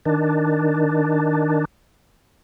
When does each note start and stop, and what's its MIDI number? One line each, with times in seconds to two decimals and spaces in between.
0.05 1.65 51
0.05 1.65 62